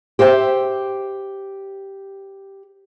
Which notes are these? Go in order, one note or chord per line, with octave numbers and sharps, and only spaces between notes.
G4 C5 E5 G5